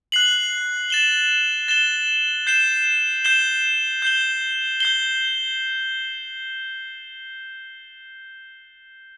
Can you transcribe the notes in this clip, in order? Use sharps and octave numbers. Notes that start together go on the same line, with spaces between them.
F#6 C7 F#7
A6 E7 G7
A6 E7 G7
G6 C7 E7 G7
G6 C7 E7 G7
G6 C7 G7
G6 C7 G7